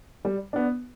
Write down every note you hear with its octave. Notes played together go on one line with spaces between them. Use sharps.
G3
B3 D4